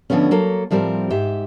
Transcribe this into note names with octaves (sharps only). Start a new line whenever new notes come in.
D3 F3 A3 B3 C#4
F#3 A#3 A4
A2 F3 G3 C4 A#4
G#2 G4 E5